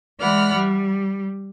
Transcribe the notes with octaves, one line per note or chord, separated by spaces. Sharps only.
E3 G#3 D5 F#5 B5 F6
G3